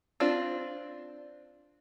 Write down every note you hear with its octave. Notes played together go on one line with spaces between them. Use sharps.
C4 D4 F4